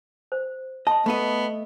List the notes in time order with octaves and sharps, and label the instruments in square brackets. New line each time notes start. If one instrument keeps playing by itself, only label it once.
[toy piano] C5
[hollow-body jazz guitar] D#5 [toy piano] A5 C6
[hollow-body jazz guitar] A3 D#5 [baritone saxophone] B3